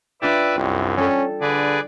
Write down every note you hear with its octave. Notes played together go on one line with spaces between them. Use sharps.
D4 F4 G4 B4 D5 E5
C2 F#2
G3 C#4 A4
D3 G#4 B4 D5